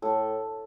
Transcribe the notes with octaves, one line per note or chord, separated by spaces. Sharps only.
A2 A4